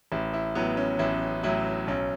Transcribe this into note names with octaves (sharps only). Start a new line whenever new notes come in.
A1 E4
E4
A2 F#3 B3
C#4
A1 E4
A2 F#3 E4
B1 C#4